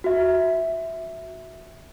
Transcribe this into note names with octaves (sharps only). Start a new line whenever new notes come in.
F#4 E5